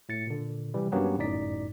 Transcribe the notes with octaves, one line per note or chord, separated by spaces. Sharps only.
A2 A6 C#7
A#2 D3
C3 E3 G3
G2 F#3 A#3 B3 C#4 G4
G1 F#2 A2 D#4 D5 B6